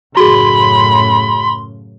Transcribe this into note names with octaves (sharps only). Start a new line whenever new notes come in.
F#2 A2 C#3 F#4 G#4 B5 C6